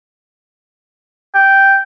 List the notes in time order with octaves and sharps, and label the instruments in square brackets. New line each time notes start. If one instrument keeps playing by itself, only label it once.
[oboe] G5